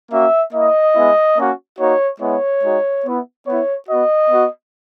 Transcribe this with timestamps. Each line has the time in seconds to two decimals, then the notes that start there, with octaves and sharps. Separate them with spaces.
0.11 A#3 C#4 F#4 E5
0.53 A#3 E4 D#5
0.95 G#3 B3 E4
1.37 A#3 C#4 F#4
1.79 A#3 D#4 F#4 C#5
2.21 G#3 B3 E4 C#5
2.63 G#3 D#4 F#4
3.05 B3 E4
3.47 B3 E4 C#5
3.88 B3 F#4 D#5
4.30 B3 F#4